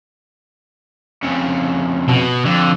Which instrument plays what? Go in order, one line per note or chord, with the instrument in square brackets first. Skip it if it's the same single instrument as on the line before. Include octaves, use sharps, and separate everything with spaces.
[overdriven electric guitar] F2 C#3
[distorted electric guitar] B2
[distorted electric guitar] F2 [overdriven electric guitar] D3